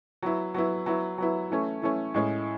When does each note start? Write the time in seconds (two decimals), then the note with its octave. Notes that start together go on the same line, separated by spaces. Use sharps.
0.23 F#3 B3 E4
0.54 F#3 B3 E4
0.86 F#3 B3 E4
1.18 F#3 B3 E4
1.50 E3 A3 C#4
1.82 E3 A3 C#4
2.14 A2 G#3 C#4